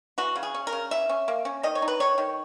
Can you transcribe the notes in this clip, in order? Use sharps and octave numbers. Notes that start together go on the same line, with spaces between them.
E3 F#4
C#3
G#4
C#4
A#4
C#3
E3 E5
C#4
A#3
C#4
D#3 D#5
C#5
D#4
B4
D#3 C#5
D#3